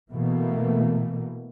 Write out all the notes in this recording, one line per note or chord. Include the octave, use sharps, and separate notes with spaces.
B2 E3 A3 A#3